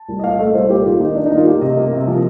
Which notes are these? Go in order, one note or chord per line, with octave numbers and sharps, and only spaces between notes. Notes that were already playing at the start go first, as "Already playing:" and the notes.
Already playing: A5
C2
D#5
A#2 F5
A3 D#5
C2 C5
A#2 G4
D#3 F4
A#3 D#4
D#3 D4
D#4
A#3
F4
A#3 G4
C3 D#5
A#3
C3
F3